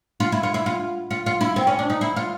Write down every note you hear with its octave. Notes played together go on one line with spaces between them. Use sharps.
F4
E4
F4
E4
F4
F4
F4
E4
C4
C#4
D4
D#4
E4
F4